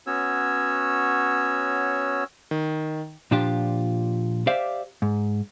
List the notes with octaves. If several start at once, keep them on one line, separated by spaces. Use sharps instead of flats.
B3 C#4 F#4 C#5 E6
D#3
A#2 F3 D4 F4 G4
G4 C5 D5 E5 F5
G#2